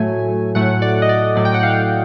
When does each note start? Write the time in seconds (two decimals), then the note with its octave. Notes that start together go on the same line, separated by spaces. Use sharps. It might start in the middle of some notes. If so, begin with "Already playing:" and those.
Already playing: A2 F#3 A3 G#5
0.55 A2 F#3 A3 F#5
0.82 D5
1.02 D#5
1.09 D5
1.36 A2 F#3 A3 D5
1.45 G5
1.54 F#5
1.63 F5